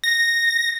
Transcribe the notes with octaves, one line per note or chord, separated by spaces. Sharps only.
A#6